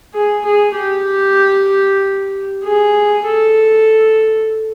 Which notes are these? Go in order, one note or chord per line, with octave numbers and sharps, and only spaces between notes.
G#4
G#4
G4
G#4
A4